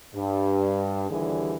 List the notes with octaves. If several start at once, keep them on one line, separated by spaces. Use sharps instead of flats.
G2
D#2 D3 E3 G3 G#4